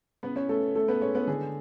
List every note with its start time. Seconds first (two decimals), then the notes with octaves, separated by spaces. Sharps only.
0.23 C#3 B3 B4
0.36 C#4 C#5
0.49 A3 A4
0.75 C#3 A3 A4
0.88 B3 B4
1.01 G#3 C#4 C#5
1.15 B3 B4
1.27 D3 G#4